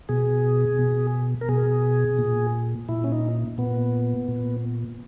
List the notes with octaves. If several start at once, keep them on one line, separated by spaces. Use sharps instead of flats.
B2 G#4
B2
A#4
B2 G#4
A#2
A#2 E4
C#4
D#4
A#2 B3
A#2